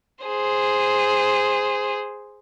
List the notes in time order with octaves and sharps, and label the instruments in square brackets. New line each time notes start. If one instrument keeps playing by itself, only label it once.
[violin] G#4 C5